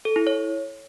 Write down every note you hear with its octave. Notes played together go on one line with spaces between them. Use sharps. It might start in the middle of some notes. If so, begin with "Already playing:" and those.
A4
E4
C#5